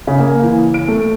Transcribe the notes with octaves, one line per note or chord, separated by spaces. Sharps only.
C#3
A#3
E3
D7
A3